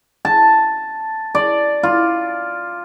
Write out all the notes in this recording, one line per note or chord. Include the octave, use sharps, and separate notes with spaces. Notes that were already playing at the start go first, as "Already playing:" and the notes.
A5
D5
F4